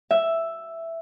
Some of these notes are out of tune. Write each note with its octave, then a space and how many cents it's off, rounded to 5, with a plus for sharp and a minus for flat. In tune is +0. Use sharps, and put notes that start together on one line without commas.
E5 +5